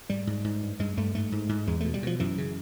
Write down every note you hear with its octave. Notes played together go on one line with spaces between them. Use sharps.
G#2 G3
G#2
G#2
G2
G2 G#3
G2 A3
G#2 A3
G#2
G#2
E2 G#3
B2 A3
G3
B2 F3
F#2 E3
C#3